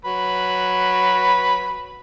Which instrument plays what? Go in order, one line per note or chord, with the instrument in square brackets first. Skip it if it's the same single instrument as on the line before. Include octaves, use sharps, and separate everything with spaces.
[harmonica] F#3 B4